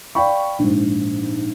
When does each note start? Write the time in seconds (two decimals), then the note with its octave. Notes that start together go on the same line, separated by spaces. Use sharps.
0.15 D5 F5 G5 B5 C#6
0.59 A#1 G#2